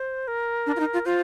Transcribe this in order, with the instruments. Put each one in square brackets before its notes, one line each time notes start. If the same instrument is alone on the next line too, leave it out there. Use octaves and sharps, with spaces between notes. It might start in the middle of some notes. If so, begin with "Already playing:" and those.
Already playing: [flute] C5
A#4
[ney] D4
F4
D#4
F4
[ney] F4 [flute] C5